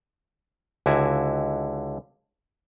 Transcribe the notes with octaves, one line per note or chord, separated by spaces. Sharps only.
C#2 D3 E4 F#4 G#5